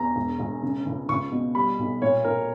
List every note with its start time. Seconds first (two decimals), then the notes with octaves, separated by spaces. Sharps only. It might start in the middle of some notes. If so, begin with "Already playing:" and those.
Already playing: E2 A#5
0.16 E1
0.40 E1
0.62 C#3
0.86 C#2
1.09 C#2 C#6
1.32 B2
1.55 G3 B5
1.79 B1
2.02 A#2 C#5
2.24 A#2 A#4